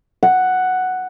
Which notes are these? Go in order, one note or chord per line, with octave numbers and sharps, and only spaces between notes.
F#5